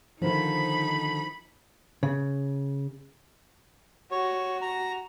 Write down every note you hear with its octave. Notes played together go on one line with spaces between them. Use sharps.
D3 D#3 F3 D#4 F4 C5 B5
C#3
F#4 C#5
A#5